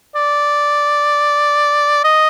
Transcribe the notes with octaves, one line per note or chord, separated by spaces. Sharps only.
D5
D#5